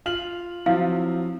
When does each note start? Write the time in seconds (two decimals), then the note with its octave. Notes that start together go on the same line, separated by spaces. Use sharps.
0.06 F4 F6 F#7
0.66 F3 F#3 C4 E4 F5